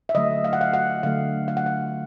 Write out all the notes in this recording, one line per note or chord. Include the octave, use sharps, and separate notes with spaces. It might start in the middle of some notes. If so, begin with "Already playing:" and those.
E5
D3 F#3 A3 D#5
F5
F#5
F5
F#5
D3 F#3 A3 F5
F5
F#5
F5